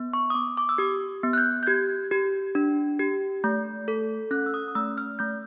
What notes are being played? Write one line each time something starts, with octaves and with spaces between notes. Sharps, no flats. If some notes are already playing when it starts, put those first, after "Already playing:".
Already playing: B3
C#6
D#6
B3 D6
D6
E6
G4 D#6
B3
F#6
G6
G6
G4 G#6
G4
D4
G4
A3 G6
A4
C#4 F#6
E6
D#6
D#6
A3 E6
F6
A3 G6